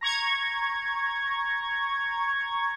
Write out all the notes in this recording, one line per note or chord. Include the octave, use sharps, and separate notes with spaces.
A#5 C#6 G#6